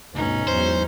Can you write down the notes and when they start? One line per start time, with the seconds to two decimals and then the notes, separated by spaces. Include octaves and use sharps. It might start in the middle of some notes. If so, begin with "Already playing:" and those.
0.15 D2 G2 B2 C#4 D#4
0.48 E2 G#2 F#3 C5